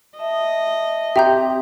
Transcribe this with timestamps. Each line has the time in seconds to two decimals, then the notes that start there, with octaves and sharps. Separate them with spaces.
0.19 D#5 E5 A5
1.16 C4 G4 E5 A#5 G6